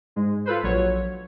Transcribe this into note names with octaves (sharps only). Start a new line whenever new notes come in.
G#2 G#3
F4 A4 B4 C5
A#1 F#3 C#5